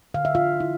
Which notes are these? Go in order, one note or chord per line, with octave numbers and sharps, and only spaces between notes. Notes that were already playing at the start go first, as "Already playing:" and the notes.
D3 F5
E5
F4 F5
E4